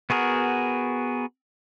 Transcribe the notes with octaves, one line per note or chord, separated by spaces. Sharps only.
B3 F#4 G#4 A#4